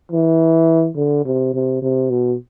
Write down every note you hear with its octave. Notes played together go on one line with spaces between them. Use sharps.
E3
D3
C3
C3
C3
B2